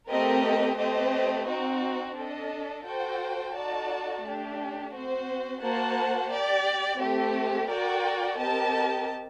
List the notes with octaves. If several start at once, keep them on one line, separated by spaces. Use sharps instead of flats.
A3 C4 G4 A#4 D#5
A3 C4 G4 C5 D#5
C4 D#4 F#4
D4 A4 D#5
F#4 A4 C5 G5
D#4 F#4 A4 D5 A5
A3 D4 G4
C4 F#4 C5
A#3 F#4 C5 F#5 A5
G4 D5 G5
A3 C4 G4
F#4 A#4 D5 G5
C4 G4 A#4 D#5 A5